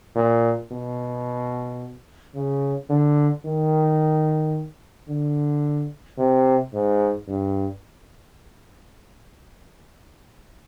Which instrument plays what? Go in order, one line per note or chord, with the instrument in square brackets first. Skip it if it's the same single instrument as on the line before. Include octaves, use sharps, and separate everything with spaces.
[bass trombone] A#2
B2
C#3
D3
D#3
D3
C3
G#2
G2